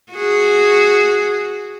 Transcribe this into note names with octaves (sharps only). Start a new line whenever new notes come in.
F#4 G#4